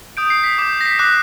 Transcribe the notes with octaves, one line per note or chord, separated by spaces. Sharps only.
D#6 G6 D7
C7
B6
D6 G6
A#6
B6
D6 F#6 C7